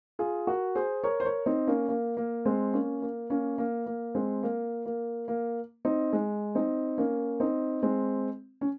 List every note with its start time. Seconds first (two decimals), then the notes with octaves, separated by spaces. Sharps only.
0.19 F4 G#4
0.47 F#4 A#4
0.75 G#4 C5
1.04 A#4 C#5
1.20 C5
1.25 A#4 C#5
1.46 C4 D#4
1.67 A#3 C#4
1.89 A#3
2.17 A#3
2.45 G#3 C4
2.73 A#3 C#4
3.02 A#3
3.30 A#3 C#4
3.58 A#3
3.86 A#3
4.15 G#3 C4
4.43 A#3
4.86 A#3
5.28 A#3
5.85 C4 D#4
6.13 G#3
6.55 C4 D#4
6.98 A#3 C#4
7.40 C4 D#4
7.83 G#3 C4
8.61 C#4